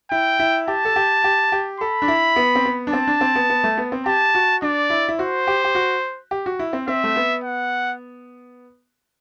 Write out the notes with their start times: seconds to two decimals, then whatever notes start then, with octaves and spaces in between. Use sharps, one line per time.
0.11 E4 G5
0.39 E4
0.68 G4 A5
0.85 A4
0.96 G4
1.24 G4
1.52 G4
1.80 A4 B5
2.02 D4
2.08 E4
2.36 B3
2.55 C4
2.66 B3
2.87 D4
2.93 C4 A5
3.07 D4
3.21 C4
3.36 B3
3.50 B3
3.64 A3
3.78 B3
3.92 C4
4.06 G4 A5
4.35 F#4
4.62 D4 D5
4.90 E4
5.09 E4
5.19 F#4 C5
5.47 G4
5.64 G4
5.75 F#4
6.31 G4
6.46 F#4
6.59 E4
6.73 C4
6.88 C4 E5
7.04 A3
7.16 B3
7.44 F#5